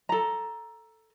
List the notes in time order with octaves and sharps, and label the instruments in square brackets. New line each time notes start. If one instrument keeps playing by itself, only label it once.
[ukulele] A4 A#5